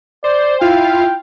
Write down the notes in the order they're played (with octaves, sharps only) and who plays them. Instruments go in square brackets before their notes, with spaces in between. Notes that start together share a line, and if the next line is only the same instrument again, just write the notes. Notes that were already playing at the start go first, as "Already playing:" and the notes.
[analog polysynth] C5 [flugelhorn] D5
[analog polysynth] E4 F4 F5 [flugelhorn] G5